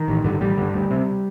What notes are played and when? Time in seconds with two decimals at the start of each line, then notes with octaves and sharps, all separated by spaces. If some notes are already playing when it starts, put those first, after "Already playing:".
Already playing: D#3
0.08 A1
0.24 G2 D3
0.41 A1 G3
0.57 G2 D3
0.74 D2
0.91 C3